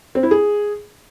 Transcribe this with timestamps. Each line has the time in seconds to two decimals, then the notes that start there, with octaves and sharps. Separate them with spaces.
0.15 C4
0.23 E4
0.31 G#4